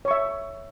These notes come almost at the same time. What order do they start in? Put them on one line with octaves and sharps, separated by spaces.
C#5 C#6 E5